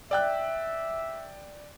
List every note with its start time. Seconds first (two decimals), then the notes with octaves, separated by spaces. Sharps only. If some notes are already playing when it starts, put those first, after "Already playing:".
0.11 D5 E5 G5 F#6